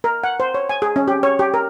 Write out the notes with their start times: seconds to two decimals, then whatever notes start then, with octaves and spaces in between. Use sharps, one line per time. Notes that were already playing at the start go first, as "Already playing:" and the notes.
0.04 A#4
0.24 F#5
0.40 C5
0.54 C#5
0.69 G#5
0.82 G#4
0.96 C#4
1.08 G4
1.23 C#5
1.39 G4
1.54 A#4